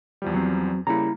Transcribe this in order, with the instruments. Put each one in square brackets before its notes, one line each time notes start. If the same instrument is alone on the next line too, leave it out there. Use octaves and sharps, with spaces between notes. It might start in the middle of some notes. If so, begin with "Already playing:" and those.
[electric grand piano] E2 F3 G3
[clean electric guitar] F#3 C4
[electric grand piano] C#3 G3 A#3 [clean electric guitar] E4 A#5